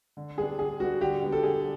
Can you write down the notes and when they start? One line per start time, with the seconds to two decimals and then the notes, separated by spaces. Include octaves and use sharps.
0.17 D3
0.37 G3 B3 D4 G#4
0.58 D3 G#4
0.80 G3 B3 D4 F#4
1.01 D3 G4
1.22 G3 B3 D4
1.32 A4
1.43 D3 G#4